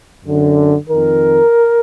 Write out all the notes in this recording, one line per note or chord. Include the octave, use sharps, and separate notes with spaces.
F#2 D3
F2 D#3 A#4